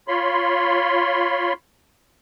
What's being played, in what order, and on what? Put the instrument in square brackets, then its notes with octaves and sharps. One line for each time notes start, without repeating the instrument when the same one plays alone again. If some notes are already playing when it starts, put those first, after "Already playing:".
[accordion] F4 C#5 B5 C6